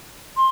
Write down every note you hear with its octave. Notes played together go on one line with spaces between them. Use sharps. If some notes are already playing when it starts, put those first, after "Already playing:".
C6